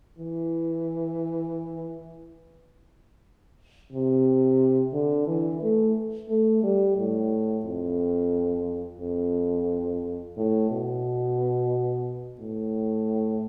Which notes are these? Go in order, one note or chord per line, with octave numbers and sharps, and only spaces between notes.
E3
C3
D3
E3
A3
A3
G3
A2
F2
F2
A2
B2
A2